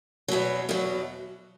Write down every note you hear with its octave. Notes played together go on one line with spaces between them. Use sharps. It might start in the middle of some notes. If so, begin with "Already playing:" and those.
E2 B2 F#3
E2 B2 F#3